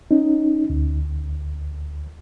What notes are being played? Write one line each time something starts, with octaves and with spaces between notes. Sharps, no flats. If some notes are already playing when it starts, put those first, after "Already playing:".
C#4 D#4
D2